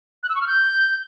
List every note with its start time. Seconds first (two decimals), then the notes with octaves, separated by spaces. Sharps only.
0.23 F#6
0.29 E6
0.35 C#6
0.41 F6
0.47 G6